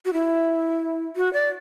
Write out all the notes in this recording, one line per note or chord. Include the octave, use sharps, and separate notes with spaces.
F#4
E4
F#4
D5